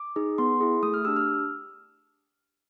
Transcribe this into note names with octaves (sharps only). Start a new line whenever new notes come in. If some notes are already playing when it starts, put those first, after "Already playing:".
Already playing: D6
D#4 G#4
B3 C6
E4 G#4
A3 D#6
F6
D4 G4 E6
F6